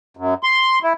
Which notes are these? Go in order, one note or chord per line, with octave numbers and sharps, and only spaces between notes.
F#2
C6
E4